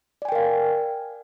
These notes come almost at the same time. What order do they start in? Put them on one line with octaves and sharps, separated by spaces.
D5 G#5 G5 A#4 F5